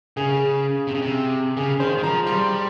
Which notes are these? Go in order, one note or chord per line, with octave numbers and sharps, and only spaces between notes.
C#3 G#4
C3
C#3
C3
C#3 G#4
D#3 C5
D#3
F3 A#5
G3 C6